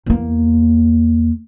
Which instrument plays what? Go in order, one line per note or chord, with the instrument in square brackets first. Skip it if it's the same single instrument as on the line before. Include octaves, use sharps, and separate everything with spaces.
[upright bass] E2 A#3